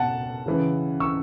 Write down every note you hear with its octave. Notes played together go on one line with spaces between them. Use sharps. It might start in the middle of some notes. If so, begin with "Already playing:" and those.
Already playing: B2 F#5 A5
C#3 E3
C#6 E6